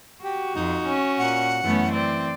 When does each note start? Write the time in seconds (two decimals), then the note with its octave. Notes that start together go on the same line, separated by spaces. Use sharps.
0.24 F#4 G4
0.56 F2 D#4
0.85 C#4
1.18 A#2 F#5
1.64 F#2 E3 A3 B3 C#4
1.92 C4 D5